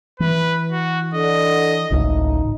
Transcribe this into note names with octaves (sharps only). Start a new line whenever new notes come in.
E3 B4
F#4
D3 D#5
G#1 C#2 A2 D#4